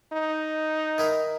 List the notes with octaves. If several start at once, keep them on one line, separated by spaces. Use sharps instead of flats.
D#4
D#3 E4 A#4